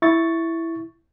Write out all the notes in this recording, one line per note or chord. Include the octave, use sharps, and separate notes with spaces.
E4 C#6 A6